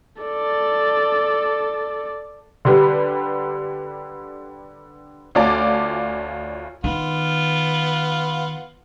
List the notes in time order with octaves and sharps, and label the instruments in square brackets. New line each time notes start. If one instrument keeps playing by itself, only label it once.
[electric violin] A4 D5
[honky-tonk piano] D3 G3 B4
D2 C#4 F4 D5 A5 D6
[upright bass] D#3 [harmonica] B3 F4